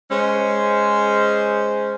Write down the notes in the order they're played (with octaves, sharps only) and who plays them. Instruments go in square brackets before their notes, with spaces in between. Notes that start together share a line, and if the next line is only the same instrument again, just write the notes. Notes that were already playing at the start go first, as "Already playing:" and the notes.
[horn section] G#3 C#4 C5